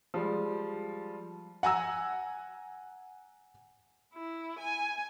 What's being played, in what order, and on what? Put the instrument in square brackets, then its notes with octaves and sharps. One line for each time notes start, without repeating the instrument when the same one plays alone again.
[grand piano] F3 G3 G#3
[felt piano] F#5 G#5 A#5 E6
[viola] E4
G#5